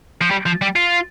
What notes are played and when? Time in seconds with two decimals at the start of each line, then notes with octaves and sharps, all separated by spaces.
0.21 F3
0.31 G3
0.46 F3
0.62 G3
0.76 F4